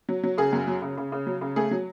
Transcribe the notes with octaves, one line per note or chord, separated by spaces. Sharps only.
F#3
F#3
C#3 G#4
F#2
F#3
C#3
C#3
C#3
F#3
C#3
A3 G#4
F#3